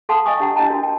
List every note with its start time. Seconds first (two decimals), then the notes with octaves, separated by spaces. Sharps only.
0.09 A4 F5 F#5 A5 C6 D#6
0.26 D#5 F5 G5 G#5 C#6 D#6
0.40 D4 G4 F#5 G5 A#5
0.56 D4 E4 D#5 G5 A5 A#5
0.70 D4 F#4 A#4
0.83 G5